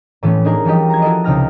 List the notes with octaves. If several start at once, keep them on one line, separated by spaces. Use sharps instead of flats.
A2 E3 A3 B3 C#4
D4 D#4 G#4 A#4
E3 F3 G3 G4 D#5
A#5 G#6
E4 F#4 A4 D#5
C#2 C3 D#4 G5 F6 A#6